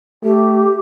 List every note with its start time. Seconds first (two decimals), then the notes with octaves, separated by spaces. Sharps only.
0.24 A3 G4